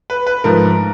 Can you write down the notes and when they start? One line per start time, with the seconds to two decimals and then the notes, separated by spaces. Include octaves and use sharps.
0.10 B4
0.26 B4
0.44 G#2 F3 A3 A#4